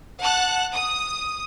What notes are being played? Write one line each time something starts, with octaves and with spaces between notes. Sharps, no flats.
F#5 A5 F#6
D#6